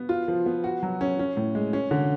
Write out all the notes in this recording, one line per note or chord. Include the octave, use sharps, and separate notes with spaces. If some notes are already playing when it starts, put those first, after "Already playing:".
Already playing: B3
F4
F3
B3
F#4
F#3
C#4
C#4
A2
G#3
C#4
D3